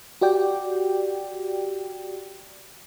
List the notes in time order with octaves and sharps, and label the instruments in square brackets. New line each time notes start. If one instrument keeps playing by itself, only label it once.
[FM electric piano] F#4 G4 D5 G5